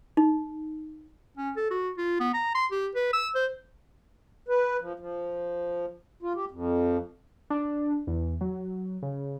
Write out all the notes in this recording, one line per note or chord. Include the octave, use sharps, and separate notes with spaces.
D#4
C#4
A4
F#4
F4
B3
A#5
C6
G4
B4
E6
C5
B4
F3
F3
F4
G4
F2
D4
E2
F#3
C#3